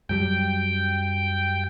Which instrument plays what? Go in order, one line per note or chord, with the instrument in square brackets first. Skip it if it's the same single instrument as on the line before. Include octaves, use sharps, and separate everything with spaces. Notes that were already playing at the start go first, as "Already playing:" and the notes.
[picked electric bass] F#2 F#3 G3 [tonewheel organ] G5